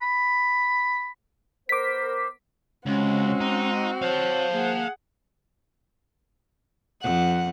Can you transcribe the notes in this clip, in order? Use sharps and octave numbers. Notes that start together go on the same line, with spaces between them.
B5
B3 A#4 C5 D6 B6
C#2 G#3 C4 C#4 F#4
D#4
C5 C#5 F5 A5
A#3 G#4 F#5
F2 F#5